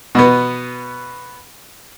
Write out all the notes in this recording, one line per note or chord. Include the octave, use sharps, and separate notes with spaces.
B2 B3